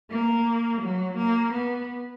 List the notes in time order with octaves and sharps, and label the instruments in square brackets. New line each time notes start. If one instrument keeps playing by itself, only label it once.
[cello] A#3
F#3
A#3
B3